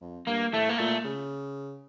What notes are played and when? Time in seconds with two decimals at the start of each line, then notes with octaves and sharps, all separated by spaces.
0.01 F2
0.27 G2 A#3
0.53 A2 A3
0.69 A#3
0.78 A#2 A3
1.04 C#3